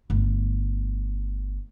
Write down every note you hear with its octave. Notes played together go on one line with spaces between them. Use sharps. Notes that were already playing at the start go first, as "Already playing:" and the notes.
G1 A3